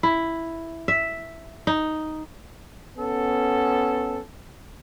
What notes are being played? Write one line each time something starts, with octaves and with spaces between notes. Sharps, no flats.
E4
E5
D#4
B3 C#4 A4